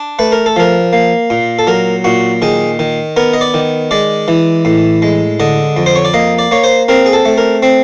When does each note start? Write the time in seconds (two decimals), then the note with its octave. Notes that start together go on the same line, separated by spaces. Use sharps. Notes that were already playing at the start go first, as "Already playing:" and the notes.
Already playing: D4
0.19 A3 B4
0.32 A#4
0.46 A4
0.56 F3 A#4
0.93 A#3
1.30 A#2
1.59 A4
1.67 F#3 A#4
2.04 A#2 F#4
2.42 D#3 G#4
2.79 D#3
3.17 B3 A#4
3.33 D#5
3.41 D5
3.54 D#3
3.91 G#3 D5
4.28 E3
4.65 A2
5.02 G#3
5.40 D3 D#5
5.77 F2
5.86 C5
5.96 C#5
6.05 D5
6.14 A#3 D#5
6.39 D5
6.51 A#3 C#5
6.64 C5
6.89 C4 A#4
7.06 G#4
7.13 A4
7.25 A3
7.38 A#4
7.63 C4